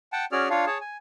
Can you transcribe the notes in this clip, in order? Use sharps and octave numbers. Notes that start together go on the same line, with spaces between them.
F#5 G5 A5
C#4 F#4 G#4 D5 F6
D4 F4 C#5 F5
G#4 C#5 A5
G#5